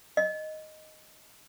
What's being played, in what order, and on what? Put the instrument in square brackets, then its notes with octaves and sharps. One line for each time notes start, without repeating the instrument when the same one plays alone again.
[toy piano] D#5